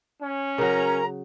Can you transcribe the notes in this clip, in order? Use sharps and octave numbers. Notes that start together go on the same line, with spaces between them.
C#4
C#3 F#3 A#4 A#5